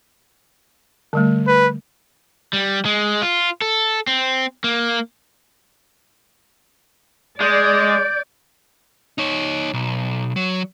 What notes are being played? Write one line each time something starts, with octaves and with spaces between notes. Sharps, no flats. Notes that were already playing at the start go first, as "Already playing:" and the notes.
D3 G3 A3
B4
G3
G#3
F4
A4
C4
A#3
G#3 D5 G6
D#4 C#5
B1
F#3